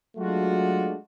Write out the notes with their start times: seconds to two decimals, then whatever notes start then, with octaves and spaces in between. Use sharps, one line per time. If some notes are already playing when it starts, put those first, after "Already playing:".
0.17 F#3 G#3 A3 D4 F4 F#4